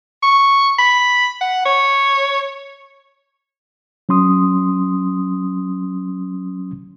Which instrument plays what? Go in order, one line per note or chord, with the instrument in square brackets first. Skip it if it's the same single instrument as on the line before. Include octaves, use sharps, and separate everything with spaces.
[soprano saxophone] C#6
B5
F#5
C#5
[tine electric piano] F#3 C#4 C6 D#6